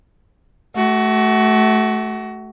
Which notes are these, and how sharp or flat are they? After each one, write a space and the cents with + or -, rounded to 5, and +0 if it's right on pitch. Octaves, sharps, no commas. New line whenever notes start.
A3 -20 F#4 +20